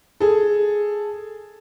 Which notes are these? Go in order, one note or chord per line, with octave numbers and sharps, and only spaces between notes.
G#4 A4